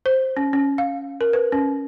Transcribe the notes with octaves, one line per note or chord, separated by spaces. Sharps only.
C5
C#4
C#4
F5
A#4
B4
C#4